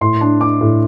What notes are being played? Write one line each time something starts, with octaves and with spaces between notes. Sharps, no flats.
A2 C6
D4
D4 D6
A2